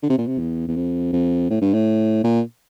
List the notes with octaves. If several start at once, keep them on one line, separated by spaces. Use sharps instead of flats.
D3
C3
A#2
C3
E2
E2
F2
F2
A2
G2
A2
A#2